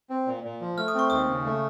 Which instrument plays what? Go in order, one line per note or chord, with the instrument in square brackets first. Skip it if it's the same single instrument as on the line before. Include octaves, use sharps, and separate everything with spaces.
[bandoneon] C4
A#2
A#2
F3
[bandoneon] A3 [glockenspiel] F6
[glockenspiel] D#6
[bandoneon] C4 [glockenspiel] C#6
[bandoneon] D#2 [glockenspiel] D#6
[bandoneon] C#3
A3